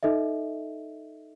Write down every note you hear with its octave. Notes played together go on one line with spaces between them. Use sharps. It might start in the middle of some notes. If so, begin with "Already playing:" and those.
D#4 A4 D#5 E5